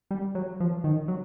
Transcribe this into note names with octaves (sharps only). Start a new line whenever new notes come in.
G3
F#3
F3
D#3
F#3